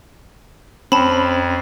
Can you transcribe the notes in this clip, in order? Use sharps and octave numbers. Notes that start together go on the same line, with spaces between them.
F2 C4 C#4 A5 B5